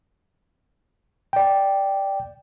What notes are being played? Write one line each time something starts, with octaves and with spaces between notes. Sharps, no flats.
D5 G5